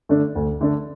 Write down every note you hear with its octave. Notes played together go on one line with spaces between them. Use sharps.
D3 A3 D4 A4
D2
D3 A3 D4 A4